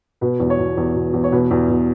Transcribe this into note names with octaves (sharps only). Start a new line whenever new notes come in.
B2 B4
E2
C#5
B2
E2
B2
E2
C#5
B2 B4
E2
B2